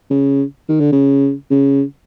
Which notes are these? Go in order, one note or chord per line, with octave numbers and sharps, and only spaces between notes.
C#3
D#3
D3
C#3
C#3